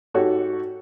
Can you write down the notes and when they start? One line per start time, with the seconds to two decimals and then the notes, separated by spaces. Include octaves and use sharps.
0.14 G#2 F#4 G4 A4 C#5